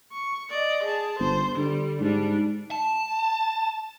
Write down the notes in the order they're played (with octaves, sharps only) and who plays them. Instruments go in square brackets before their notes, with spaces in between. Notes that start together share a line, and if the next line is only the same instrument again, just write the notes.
[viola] C#6
D5 D#5
G#4 A5
[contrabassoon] G1 [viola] C5
[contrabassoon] D3 [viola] G3
[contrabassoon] G#2 [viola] G3 D4
[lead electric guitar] A5